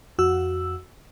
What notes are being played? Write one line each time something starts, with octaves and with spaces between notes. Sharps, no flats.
F2 F#4 E6